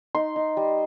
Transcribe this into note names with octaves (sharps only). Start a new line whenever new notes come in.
D#4 C6
D#4
G3